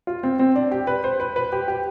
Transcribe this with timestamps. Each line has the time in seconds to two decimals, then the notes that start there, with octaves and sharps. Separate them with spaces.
0.07 F4
0.23 C4
0.39 C4
0.55 D4
0.71 G4
0.87 B4
1.04 C5
1.20 B4
1.36 B4
1.52 G4
1.68 G4